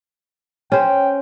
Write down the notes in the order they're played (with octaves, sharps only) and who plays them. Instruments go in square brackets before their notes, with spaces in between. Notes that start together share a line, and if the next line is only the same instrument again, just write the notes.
[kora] C#4 C5 [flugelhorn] G5